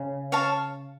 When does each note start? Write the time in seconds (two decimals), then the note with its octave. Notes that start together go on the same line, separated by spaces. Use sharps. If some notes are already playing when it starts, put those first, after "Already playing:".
Already playing: C#3
0.32 C#5 F5 A5